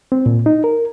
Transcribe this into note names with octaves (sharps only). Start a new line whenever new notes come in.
C4
A#2
D#4
A#4